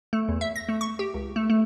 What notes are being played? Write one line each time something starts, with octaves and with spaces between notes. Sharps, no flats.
A3
E2
E5
A#6
A3
C#6
G4
C#2
A3
A3